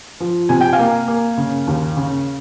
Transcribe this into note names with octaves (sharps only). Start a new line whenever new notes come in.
F3
C3 G#5
G5
F5 G#5
A#3
A#3
C#3
D#2
C#3